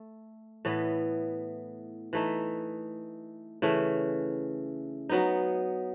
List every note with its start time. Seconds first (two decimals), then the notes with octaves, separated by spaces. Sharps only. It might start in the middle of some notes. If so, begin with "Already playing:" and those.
Already playing: A3
0.65 A2 E3 B3
2.13 E3 A3 D#4
3.62 C#3 E3 A3
5.09 F#3 B3 D#4